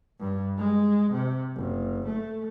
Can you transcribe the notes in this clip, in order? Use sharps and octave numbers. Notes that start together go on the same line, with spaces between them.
G2
G#3
C3
F#1
A3